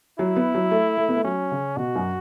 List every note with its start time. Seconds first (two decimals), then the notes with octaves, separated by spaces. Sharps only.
0.19 F#3 E4
0.36 B3
0.55 F#3
0.71 A3
0.97 A3
1.09 B3
1.17 A3
1.24 F#3 C#4
1.51 C#3
1.77 B2 F#4
1.95 F#2